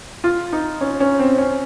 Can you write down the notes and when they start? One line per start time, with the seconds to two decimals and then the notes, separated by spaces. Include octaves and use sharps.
0.24 F4
0.53 D#4
0.81 C#4
1.00 C#4
1.20 C4
1.38 C#4